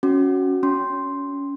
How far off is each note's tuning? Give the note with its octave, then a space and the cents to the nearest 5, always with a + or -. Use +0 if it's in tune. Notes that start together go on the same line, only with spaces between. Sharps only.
C#4 +0 F#4 +0
C#4 +25 C6 +0